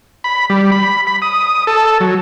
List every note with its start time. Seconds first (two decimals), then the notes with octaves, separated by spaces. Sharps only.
0.24 B5
0.50 G3
0.72 B5
1.07 B5
1.22 D#6
1.67 A4
2.00 F#3